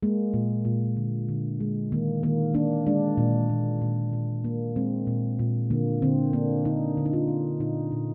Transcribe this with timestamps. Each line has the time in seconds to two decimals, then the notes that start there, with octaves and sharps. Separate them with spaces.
0.03 G#3 A#3
0.34 A#2
0.65 A#2
0.97 D3
1.29 D3
1.60 G#3
1.92 D#3 A#3
2.23 D#3 A#3
2.54 A#3 D4
2.87 G#3 D4
3.17 A#2
3.50 A#2
3.82 A#2
4.13 A#2
4.44 A#3
4.76 G#3 C4
5.07 A#2
5.39 A#2
5.70 D3 A#3
6.02 D3 C4
6.33 A#3 D4
6.65 D3 D#4
6.97 D3
7.05 D#4
7.13 F4
7.28 A#3
7.60 A#2 D#4
7.92 A#2